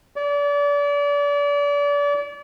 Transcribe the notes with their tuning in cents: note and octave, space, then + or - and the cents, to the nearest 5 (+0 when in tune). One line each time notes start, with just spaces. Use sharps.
D5 -35